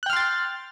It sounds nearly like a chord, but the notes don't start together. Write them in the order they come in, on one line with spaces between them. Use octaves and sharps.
F#6 G5 F6 C6 A6